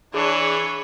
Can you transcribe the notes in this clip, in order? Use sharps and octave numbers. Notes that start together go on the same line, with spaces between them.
E3 D4 G#4 C#5